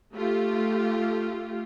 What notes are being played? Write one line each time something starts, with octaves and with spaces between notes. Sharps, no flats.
A3 F4 G4